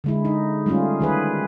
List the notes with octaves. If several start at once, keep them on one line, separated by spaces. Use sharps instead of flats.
D3 G#3 E4
D#4
G3 A3 C#4 F4 G#4
D#3 G#4 B4